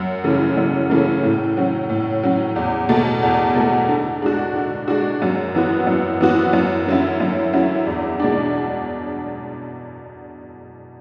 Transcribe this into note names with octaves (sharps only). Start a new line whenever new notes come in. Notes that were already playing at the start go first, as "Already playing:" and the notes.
Already playing: F#2
C#3 E3 A3
F#2
C#3 E3 A3
A2
F#3 C#4
A2
F#3 C#4
E2
B2 A3
E2
B2 A3
D3
G#3 D4 F#4
D3
G#3 D4 F#4
F#2
E3 B3 F#4
F#2
E3 B3 F#4
F#2
D3 F#3 C#4 E4
F#2
D3 F#3 C#4 E4
E2
B2 G#3 D4